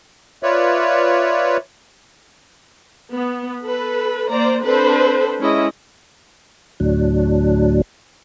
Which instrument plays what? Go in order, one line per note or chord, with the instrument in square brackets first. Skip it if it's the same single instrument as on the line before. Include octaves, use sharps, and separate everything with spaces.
[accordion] F4 B4 C#5 D5 E5
[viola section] B3
A4 B4
A#3 C5 D5 A#5
C4 D4 A4 B4 C5
G#3 C#4 E4 D#5
[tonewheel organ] D2 A2 F#3 D4